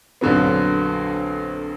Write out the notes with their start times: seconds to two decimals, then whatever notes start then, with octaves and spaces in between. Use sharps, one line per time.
0.21 A#1 F2 D3 F#3 B3